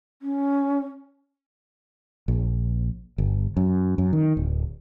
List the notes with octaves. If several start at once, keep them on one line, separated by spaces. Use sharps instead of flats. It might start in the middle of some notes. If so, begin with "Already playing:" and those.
C#4
A#1
G1
F#2
F#2
D#3
D1